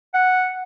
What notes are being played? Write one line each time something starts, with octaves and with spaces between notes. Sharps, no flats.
F#5